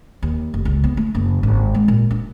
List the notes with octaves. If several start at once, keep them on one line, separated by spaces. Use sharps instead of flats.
D#2
F1
C#2
B3
A3
F#1
G#1
G#3
A#2
D4